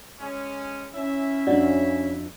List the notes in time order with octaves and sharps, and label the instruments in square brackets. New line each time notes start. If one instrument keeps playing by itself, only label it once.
[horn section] G#3 C#4
[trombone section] C#4 [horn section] E4 E5
[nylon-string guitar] F2 D4 F#4 [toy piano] D5 D#5